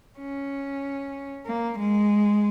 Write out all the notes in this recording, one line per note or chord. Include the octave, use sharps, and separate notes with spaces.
C#4
A#3
G#3